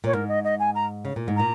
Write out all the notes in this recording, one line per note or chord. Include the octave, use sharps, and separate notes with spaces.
A#2 C#5
G#2 A#4
D#5
D#5
G#5
A#5
C#3
A#2
G#2
A#2 A#5